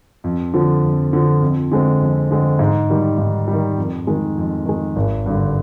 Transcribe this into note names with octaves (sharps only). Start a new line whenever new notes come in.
F2
D3 F3
F2
D3 F3
F2
D3 G#3 C4
F2
D3 G#3 C4
G#2
D#3 G3
G#2
G3
D#3
F2
D#3 G#3
F2
D#3 G#3
G#1
G2 D3